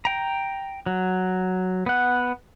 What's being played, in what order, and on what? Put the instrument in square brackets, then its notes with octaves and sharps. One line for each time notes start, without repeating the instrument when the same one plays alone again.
[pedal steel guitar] G5 A#5
F#3
B3 F#5